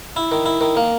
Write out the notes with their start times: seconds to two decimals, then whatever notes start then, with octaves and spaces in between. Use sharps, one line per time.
0.16 E4
0.32 D#3
0.46 E4
0.61 D#3
0.76 A#3